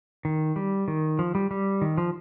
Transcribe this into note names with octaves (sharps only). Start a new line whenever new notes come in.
D#3
G3
D#3
F3
G3
G3
D#3
F3